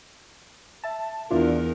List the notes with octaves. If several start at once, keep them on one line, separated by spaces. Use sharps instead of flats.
E5 A5
E2 D4 E4 F4 A#4